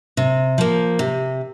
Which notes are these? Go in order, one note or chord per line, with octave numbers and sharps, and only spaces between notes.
C3
F3 A#3
C3